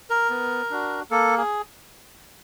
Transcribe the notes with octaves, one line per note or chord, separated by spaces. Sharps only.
A#4
B3
D4 F#4
A#3 A4
G#4